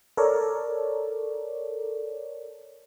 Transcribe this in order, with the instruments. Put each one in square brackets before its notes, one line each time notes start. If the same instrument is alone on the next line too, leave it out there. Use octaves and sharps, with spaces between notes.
[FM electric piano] A4 A#4 C#5 D5